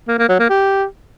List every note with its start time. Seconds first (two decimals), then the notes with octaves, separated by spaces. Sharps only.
0.08 A#3
0.18 A#3
0.29 F#3
0.39 A#3
0.49 G4